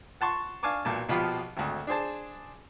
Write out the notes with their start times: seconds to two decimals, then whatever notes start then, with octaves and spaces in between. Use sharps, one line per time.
0.21 F#5 A5 C6 C#6
0.63 D4 F5 G#5 A5 C#6 D6
0.85 B1 A#2 A5
1.09 A#1 B2 F3 F4 G4 B5
1.57 G#1 D2
1.87 D4 G#4 C5 A5